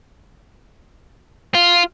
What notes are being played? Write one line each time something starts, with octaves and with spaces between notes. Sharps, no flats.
F4